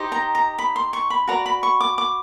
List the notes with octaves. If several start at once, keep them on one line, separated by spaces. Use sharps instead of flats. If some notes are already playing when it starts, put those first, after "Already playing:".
Already playing: D#4 G4 C5 D#5
A#5
A#5
B5
C6
C#6
B5
F#4 B4 D5 A#5
B5
C#6
D6
D6